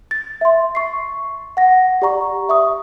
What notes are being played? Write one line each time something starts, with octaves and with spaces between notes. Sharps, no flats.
A6
E5 C6
C#6 C7
F#5 A#6
G4 D5 A#5 C#6
E5 C#6 D#6